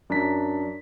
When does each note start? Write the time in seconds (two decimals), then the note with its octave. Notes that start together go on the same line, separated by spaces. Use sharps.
0.09 F#2 D4 A#5 B6